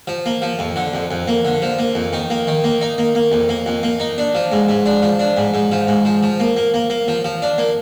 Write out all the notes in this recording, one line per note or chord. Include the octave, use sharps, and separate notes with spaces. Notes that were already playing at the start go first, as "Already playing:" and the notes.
F3
A#3
F3
F2
D3
F2
F2
A#3
D3
F3
A#3
F2
D#3
A#3
D#3
A#3
D#4
A#3
A#3
F2
A#3
F2
A#3
D#4
D4
F3
G#2
G#2
D4
F3
D4
G#2
G#2
F3
G#2
F3
F3
A#3
A#3
A#3
A#3
F3
F3
D4
A#3